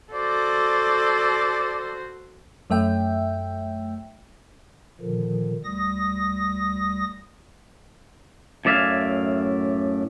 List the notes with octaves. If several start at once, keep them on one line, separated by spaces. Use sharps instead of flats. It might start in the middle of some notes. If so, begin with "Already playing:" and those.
F#4 A4 C5 D5
F#2 A3 E5 G5
A#2 D3 D#3 F3
D2 G3 D#6 A#6
F#2 A2 D5 E5 F5 G#5